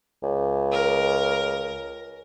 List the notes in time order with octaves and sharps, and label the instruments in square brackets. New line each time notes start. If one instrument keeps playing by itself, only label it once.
[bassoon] C#2
[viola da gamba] A#4